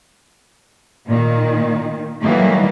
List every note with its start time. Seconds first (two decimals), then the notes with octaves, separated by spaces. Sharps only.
1.08 A#2 D#3
2.22 D#3 E3 F#3 G3 A3 A#3